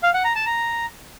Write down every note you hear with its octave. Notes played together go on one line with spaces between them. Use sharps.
F5
F#5
A#5
A5
A#5